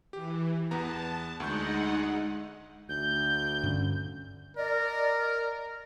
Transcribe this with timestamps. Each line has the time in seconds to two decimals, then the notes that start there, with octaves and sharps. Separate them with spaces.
0.13 E3 G4
0.71 E2 B3 A5 A#5
1.40 D2 G#3 D#4 F#5 C#6 G6
2.89 D2 G6
3.63 G2 D3 C#4
4.57 A#4 D5 D#5